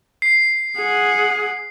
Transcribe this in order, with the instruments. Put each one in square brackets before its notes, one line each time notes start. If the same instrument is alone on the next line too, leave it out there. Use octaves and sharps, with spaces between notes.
[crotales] C7
[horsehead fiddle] G#4 F#5